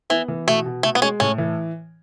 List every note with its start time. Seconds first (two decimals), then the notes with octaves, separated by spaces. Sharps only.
0.10 E3 B3
0.28 E3
0.47 B2 A3
0.66 B2
0.83 B2 A3
0.95 B3
1.02 G#3 C#4
1.20 A2 C#4
1.38 E3